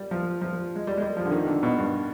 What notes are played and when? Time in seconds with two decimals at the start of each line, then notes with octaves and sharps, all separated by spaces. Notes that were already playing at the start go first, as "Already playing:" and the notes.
Already playing: G3
0.11 F3
0.41 F3
0.75 G#3
0.87 G3
0.97 G#3
1.02 G3
1.17 F3
1.25 D3
1.32 D#3
1.47 D3
1.63 B2
1.77 G2